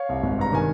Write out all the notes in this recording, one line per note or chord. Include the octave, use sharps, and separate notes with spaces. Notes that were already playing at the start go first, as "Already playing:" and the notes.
Already playing: C#5 F5
C2
G#1
G2 A#5
D#3 G#5